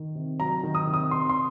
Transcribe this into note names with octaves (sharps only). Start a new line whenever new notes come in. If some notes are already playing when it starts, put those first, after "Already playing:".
Already playing: D#3
C3
F#3 A#5
D#3
D#6
C3
D#6
C3 C6
C6